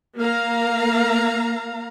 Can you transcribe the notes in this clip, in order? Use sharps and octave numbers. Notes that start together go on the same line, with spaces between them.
A#3 F5 A#5